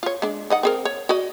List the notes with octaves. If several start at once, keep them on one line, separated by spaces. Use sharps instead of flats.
F4 C#5
G#3 D4
D#3 D#5 F#5
C4 G#4 A#4
C#5
F#4 D5 D#5